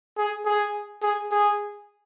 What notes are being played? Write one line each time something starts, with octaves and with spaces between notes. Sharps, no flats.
G#4
G#4
G#4
G#4